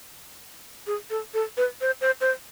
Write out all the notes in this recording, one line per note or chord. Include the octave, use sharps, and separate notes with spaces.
G#4
A4
A4
B4
C5
C5
C5